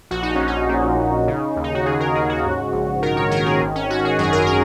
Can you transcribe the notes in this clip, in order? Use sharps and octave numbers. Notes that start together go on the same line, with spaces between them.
A#1 F#4
D#4
A#1 C#4
D#4
A#2
A#1
C#3
D#2
D#4
F#4
D#2 G#4
A#4
C#3 G#4
F#4
G#2
A#1
D#3 A#4
C#5
D#3 A#4
G#4
G#1
C#4
G#1 F#4
G#4
F#2 G#4
A#4
G#4